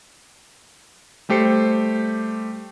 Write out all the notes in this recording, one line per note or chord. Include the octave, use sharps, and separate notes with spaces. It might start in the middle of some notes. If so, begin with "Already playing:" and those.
G3 A3 G4 C5 C7 C#7